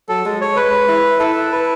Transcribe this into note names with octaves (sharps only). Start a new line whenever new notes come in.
F#3 A4
G#3
C#5
G#3 B4
E4
E4 A4
B4